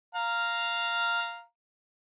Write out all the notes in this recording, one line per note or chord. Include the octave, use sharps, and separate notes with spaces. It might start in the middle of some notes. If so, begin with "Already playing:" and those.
F5 A#5